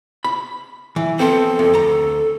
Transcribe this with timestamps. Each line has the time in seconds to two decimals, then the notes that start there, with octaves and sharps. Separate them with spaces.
0.24 B5
0.96 E3
1.19 F3 B3 C4 A4
1.59 F2
1.74 D2 A#5